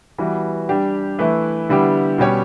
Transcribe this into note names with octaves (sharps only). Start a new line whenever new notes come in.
E3 G3 B3 F#4
G3 D4 G4
E3 A3 E4 B4
D3 G3 B3 E4 G4
B2 G3 C#4 G4 C#5